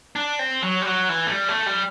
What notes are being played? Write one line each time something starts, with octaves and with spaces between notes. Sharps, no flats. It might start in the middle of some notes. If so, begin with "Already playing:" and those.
D4
C4
F#3
G3
F#3
E3
A3
G3
A3
G3